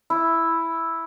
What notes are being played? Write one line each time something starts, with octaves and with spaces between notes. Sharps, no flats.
E4